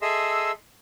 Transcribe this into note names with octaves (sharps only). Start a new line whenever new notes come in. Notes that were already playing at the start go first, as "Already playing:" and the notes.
G#4 A4 D#5 E5 C6 E6